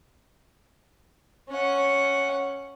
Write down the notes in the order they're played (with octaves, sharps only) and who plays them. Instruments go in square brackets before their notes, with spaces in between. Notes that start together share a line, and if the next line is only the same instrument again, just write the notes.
[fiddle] C#4 F#5